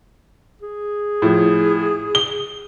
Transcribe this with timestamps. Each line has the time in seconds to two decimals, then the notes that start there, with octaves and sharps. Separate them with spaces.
0.62 G#4
1.22 A2 F3
2.15 G7